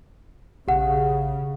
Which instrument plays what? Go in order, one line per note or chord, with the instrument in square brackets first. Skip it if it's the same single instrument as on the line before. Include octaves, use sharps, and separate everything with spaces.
[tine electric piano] A#1 [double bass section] C#3 [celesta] G4 F#5